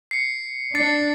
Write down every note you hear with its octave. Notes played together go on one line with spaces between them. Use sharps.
C7 C#7
D4 A6 C7 C#7